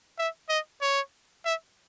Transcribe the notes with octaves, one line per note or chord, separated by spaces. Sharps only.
E5
D#5
C#5
E5